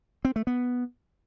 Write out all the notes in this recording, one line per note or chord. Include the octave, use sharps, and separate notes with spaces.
C4
A3
B3